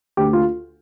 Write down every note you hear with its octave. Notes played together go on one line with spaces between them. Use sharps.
D2 G4
F4